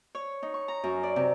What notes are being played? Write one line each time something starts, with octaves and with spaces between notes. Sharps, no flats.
C#5
D#4
C#6
A#5
F#2
D5
C3